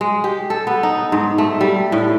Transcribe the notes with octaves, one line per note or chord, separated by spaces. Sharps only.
G#3
G4
A4
B3
D#4
G#2
A3
G3
A2